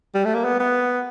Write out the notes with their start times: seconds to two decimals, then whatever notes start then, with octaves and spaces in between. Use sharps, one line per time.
0.15 G3
0.25 A3
0.35 A#3
0.45 B3
0.60 B3